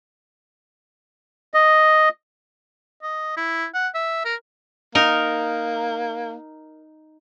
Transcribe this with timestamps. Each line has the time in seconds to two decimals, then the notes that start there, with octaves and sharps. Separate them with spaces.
1.54 D#5
3.03 D#5
3.37 E4
3.74 F#5
3.95 E5
4.25 A#4
4.95 A#3 D#4 A#4